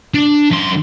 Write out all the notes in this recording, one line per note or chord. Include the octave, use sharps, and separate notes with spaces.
D4
F#2 C6